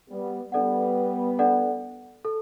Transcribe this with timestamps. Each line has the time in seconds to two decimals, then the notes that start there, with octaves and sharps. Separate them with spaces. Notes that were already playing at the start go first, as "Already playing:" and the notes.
0.10 G3 B3
0.52 G3 B3 D4 A4 D5 F#5
1.39 D4 A4 D5 F#5
2.25 A4